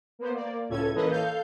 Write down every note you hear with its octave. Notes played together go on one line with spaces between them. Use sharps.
A#3 B3 C5
A#3 D5
C#2 A2 C#4 A4 G#6
E3 A#3 C#4 A4 B4 D#5
A4 F5 G6